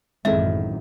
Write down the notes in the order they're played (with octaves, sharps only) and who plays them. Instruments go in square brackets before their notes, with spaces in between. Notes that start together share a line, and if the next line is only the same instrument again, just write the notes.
[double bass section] A1 F#2 [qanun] D#3 E4 [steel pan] G#3 C4 A4 [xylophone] E5